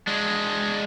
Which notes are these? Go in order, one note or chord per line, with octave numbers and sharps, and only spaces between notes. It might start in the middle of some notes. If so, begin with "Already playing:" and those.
G#3 D4